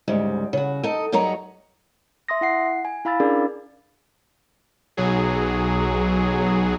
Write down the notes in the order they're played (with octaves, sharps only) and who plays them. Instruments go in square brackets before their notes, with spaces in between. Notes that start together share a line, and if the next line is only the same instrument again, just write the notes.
[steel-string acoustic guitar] D2 G#2 C#3 G3 G#3
C#3 F#4
D#4 A4 D#5
G2 F#3 B3 D#4 C#5 A#5
[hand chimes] E5 C6 D#6 A#6
E4 F#5 C7
G#5
E4 F5 B5 E6 A6
C#4 D4 E4 G#4 A#4 D5
[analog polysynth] B1 F#3 G#4